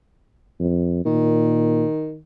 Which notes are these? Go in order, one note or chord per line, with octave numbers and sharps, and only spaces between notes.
F2
A#2 D#3